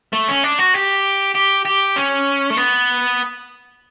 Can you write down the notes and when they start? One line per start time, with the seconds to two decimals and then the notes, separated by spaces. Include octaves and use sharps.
0.13 A3
0.28 C#4
0.43 D4
0.59 F#4
0.74 G4
1.35 G4
1.65 G4
1.96 C#4
2.50 A3
2.57 B3